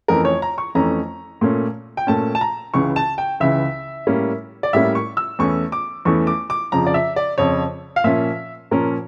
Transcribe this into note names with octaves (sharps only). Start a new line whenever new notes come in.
F2 E3 A3 C#4 A#4
C#5
A#5
C#6
F2 E3 A3 C#4 A#5
A#2 A3 C#4
G5
A#2 A3 C#4 A5
A5
A#5
C#2 C#3 E3 C#6
A5
G5
C#2 C#3 E3 E5
A2 G3 A#3 C#4
D5
A2 G3 A#3 C#4 E5
C#6
E6
E2 E3 A3 C#4 C#6
D6
E2 E3 A3 C#4 C#6
D6
D6
F2 C#3 F3 A#5
D5
E5
D5
F2 C#3 F3 C#5
F5
A#2 F3 C#4 E5
A#2 F3 C#4 A#4